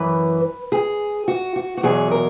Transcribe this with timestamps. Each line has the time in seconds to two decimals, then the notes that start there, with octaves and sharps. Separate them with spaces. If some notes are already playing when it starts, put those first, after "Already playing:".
Already playing: F#2 E3 B4
0.72 G#4
1.28 F#4
1.56 F#4
1.77 F#4
1.83 E2 B2 F#3 G#4
2.11 A#4